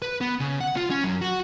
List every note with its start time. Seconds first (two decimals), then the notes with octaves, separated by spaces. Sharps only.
0.02 B4
0.21 B3
0.40 C#3
0.60 F#5
0.77 F4
0.90 C#4
1.04 F#2
1.22 F#4